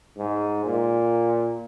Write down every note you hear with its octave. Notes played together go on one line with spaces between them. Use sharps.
G#2
A#2